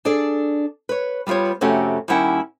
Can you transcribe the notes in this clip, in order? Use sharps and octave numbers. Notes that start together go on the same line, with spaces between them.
D4 G#4 A4 D5
B4 C#5
G3 B3 F4 G4 C#5
F2 C3 A3 C#4 F#4 G4
D#2 G3 C#4 E4 F#5 G5